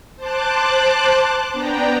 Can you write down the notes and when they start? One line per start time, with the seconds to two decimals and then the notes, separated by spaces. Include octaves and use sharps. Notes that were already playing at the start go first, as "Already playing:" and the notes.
0.16 C5 A5 D6 F#6
1.52 B3 D4 G5 A#5